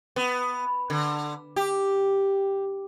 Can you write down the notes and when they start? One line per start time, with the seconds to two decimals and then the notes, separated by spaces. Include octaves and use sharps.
0.16 B3
0.90 D3
1.56 G4